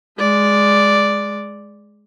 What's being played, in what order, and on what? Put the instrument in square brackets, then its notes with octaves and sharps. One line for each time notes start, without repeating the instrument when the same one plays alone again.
[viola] G#3 D5